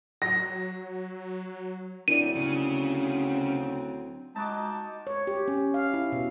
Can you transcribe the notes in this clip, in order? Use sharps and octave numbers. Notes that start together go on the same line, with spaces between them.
F#3 A#6
D2 F#3 C4 D4 E4 D5 D#7
C#3
G#3 D#4 F#4 A5 D6
C#5
G4
C#4
F5
E4
B2